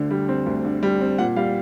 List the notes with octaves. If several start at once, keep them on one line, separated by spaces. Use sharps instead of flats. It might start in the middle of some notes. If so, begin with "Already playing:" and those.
Already playing: D2 D3
G3
C4
D2
D3
G3
C4
A#2 F#5
G3 F5